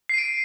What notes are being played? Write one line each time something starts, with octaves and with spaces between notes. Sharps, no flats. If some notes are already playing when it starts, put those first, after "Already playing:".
C7 D7 D#7